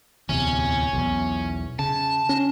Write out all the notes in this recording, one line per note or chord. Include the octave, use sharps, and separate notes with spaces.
D1 E2 C3 C#4
B1 E2
C#3 A5
C#4